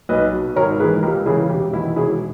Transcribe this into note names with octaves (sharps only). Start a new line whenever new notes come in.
B1 B4 D#5
B2
G#1 A#4 C#5
G#2 E3 G#4 B4
C#2 G4 A#4
C#3 E3 E4 G#4
E1 G4
E2 D#3 E4
E1 E4 G#4